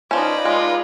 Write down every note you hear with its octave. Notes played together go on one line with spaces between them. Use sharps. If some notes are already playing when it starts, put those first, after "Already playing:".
F3 C#4 D#4 B4 D5
G#3 F4